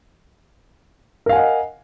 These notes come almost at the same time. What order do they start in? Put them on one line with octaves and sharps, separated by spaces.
A#4 F5 G#5 F#5 D#5